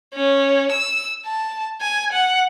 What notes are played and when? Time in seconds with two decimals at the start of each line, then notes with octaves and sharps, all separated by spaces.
0.14 C#4
0.72 E6
1.26 A5
1.81 G#5
2.12 F#5